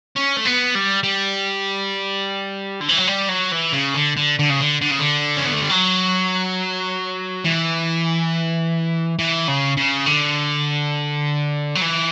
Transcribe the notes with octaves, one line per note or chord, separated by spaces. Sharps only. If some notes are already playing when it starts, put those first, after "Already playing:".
C#4
A3
B3
G3
G3
D3
E3
F#3
G3
F#3
E3
C#3
D3
D3
D3
C#3
D3
D3
C#3
D3
C#4
B3
A3
G3
F#3
E3
E3
C#3
C#3
D3
F#3
E3